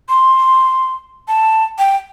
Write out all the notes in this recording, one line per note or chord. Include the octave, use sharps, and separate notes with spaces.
C6
A5
G5